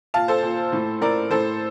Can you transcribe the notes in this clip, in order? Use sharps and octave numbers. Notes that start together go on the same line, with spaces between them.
A#2 F5 A5
A4 C5
A#2
A2
A2 A#4 D5
A2 A4 C5